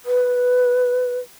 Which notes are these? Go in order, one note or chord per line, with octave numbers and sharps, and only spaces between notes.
B4